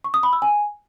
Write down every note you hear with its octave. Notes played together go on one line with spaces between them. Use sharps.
C#6
D#6
B5
E6
G#5